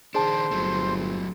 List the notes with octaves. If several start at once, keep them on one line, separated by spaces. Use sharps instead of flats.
D#3 D4 G#4 C5 A5
G1 F#3 A3